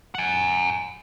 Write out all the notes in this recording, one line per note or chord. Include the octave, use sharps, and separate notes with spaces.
F#5 G#5